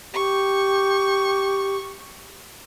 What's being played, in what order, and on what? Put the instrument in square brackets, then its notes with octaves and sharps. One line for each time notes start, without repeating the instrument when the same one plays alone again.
[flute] G4 [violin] C#6